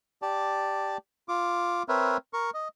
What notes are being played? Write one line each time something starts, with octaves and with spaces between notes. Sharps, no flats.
G4 D5 A5
F4 D6
C4 A#4 B4 C#5 E5
A#4 C#6
D#5